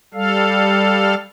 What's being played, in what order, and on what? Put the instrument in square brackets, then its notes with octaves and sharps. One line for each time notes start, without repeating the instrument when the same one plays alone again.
[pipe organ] G3 A4 F5